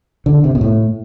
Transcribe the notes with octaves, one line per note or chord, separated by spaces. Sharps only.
D3
C3
B2
A2